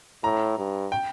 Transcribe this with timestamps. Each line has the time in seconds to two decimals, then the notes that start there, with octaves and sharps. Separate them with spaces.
0.23 A2 A#5
0.58 G2
0.92 G5